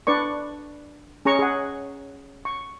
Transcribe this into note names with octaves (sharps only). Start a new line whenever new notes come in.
D4 B4 D5 C#6
C#4 G#4 A#5 C#6
G#4 F#5
C#6